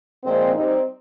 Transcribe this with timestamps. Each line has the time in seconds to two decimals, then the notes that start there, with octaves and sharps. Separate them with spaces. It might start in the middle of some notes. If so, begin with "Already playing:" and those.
0.24 A#2 F3 G#3 C4
0.53 G3 C4 D#4